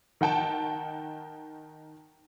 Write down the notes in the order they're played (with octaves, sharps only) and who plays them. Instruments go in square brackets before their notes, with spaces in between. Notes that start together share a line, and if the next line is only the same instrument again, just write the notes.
[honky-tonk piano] D#3 F#5 G5 A5